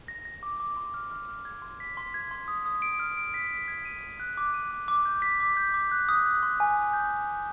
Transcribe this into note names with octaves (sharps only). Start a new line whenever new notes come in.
A#6
A#6
D6
D6
C6
F6
F6
F6
G#6
C6
B6
C6
G#6
C6
D#6
D#6
D7
F6
D7
B6
D7
G#6
D#7
D#7
F#6
D6
D#7
D6
D6
G6
B6
D6
G6
D6
F#6
D#6
F#6
C6
G#5
D#6
G6
G6
G6